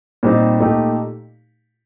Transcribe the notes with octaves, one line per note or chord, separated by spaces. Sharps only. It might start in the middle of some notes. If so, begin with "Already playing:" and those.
A#2 G3 C4 D#4
A#2 A3 D#4 G4